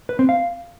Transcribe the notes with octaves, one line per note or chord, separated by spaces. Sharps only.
B4
C4
F5